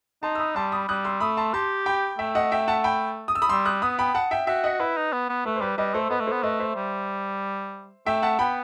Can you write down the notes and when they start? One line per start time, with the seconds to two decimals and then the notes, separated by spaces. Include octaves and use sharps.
0.23 D#4 A5 C6
0.35 E6
0.39 B5 D#6
0.56 G3 A5 C6
0.72 B5 D#6
0.89 G3 D#6 F#6
1.04 C6 E6
1.20 A3 B5 D#6
1.37 A5 C6
1.54 G4 A5 C6
1.86 G5 B5
2.19 A3 E5 G5
2.35 D#5 F#5
2.52 E5 G5
2.68 F#5 A5
2.84 G5 B5
3.28 D#6
3.35 E6
3.42 B5 D#6
3.49 G3 C6 E6
3.65 D#6 F#6
3.82 B3 B5 D#6
3.99 G5 B5
4.14 F#5 A5
4.31 E5 G5
4.47 F#4 E5 G5
4.64 D#5 F#5
4.80 E4 B4
4.97 D#4
5.13 B3
5.29 B3
5.46 A3 B4
5.56 C5
5.61 G3 B4
5.78 G3 B4 D#5
5.94 A3 A4 C5
6.10 B3 B4 D#5
6.20 A3
6.27 B3 A4 C5
6.43 A3 B4 D#5
6.60 C5 E5
6.76 G3
8.06 A3 E5 G5
8.23 F#5 A5
8.39 B3 G5 B5